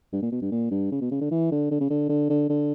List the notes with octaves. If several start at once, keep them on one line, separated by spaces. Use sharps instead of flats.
G2
A#2
B2
G2
A#2
G2
C#3
B2
C#3
D3
E3
D3
D3
C#3
D3
D3
D3
D3